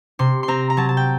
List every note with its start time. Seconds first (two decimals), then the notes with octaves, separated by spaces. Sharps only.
0.19 C3 C6
0.43 C6
0.48 C4 A#5
0.70 A#5
0.77 F#3 A5
0.89 A5
0.97 G5